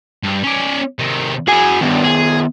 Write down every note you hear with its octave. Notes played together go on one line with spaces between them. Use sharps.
G2
C#4 D5
C3 D#3
E4 F#4 G#4 G#5
C2 G2 D#3 B3
G#4